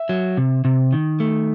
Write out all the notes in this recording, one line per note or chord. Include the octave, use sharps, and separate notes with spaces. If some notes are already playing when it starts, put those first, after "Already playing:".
Already playing: E5
F#3
C3
C3
D#3
A3